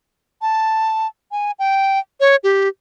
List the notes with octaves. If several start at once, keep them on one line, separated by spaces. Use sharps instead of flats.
A5
G#5
G5
C#5
G4